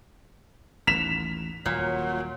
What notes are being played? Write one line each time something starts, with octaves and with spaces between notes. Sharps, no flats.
A1 D#2 B6 E7 F7
D#1 A#2 F#3